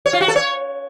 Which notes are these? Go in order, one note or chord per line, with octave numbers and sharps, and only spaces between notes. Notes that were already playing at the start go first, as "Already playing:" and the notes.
C#5
F4
F#4
A4
C#5